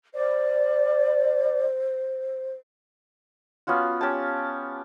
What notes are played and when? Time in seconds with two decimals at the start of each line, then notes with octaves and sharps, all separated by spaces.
0.14 C5 D5
3.67 B3 C#4 F4 F#4
4.01 C#4 G4 A5